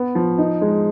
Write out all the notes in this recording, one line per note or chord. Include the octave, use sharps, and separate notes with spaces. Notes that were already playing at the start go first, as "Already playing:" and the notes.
Already playing: B3
F3
D#4
G#3